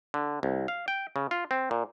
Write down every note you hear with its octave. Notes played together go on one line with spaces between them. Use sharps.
D3
C2
F5
G5
C#3
F4
C4
A#2